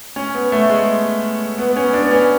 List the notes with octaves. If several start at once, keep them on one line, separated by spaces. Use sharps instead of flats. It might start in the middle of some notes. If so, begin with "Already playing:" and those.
C#4
B3
A3
G#3
B3
B3
C#4
D4
B3
C#4